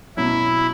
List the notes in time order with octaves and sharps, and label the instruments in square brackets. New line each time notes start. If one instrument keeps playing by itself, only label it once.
[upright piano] B2 F#3 C#4 [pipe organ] E4